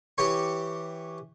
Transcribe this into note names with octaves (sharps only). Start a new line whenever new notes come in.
E3 G4 C#5 C#6